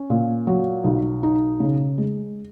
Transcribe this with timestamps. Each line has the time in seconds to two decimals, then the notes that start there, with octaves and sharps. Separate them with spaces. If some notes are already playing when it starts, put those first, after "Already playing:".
Already playing: C#4
0.10 A#2
0.47 F#3
0.84 B1
1.23 D#4
1.60 C#3
1.98 G#3